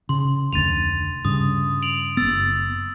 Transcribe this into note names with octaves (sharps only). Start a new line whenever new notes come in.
C#3 C6
F1 D2 A6 D#7 F7
G2 C#3 D#6
D7 F7 F#7
F#1 B3 E6 A6